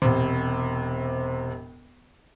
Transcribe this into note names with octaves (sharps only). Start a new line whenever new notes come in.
E1 C3